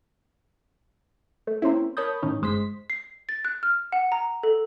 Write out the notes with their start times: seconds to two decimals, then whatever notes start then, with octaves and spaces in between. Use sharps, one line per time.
1.47 A3
1.62 A#3 C4 C#4 E4
1.97 A#4 C#5 A5 B5 D#6 G6
2.22 A2 D#3 C#4 D#4
2.42 G1 G#3 C5 C6 B6
2.90 C7
3.29 A6
3.45 F#6
3.63 F6
3.92 F#5
4.12 A#5
4.43 A4